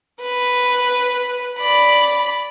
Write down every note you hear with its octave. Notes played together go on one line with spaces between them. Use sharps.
B4
D5 B5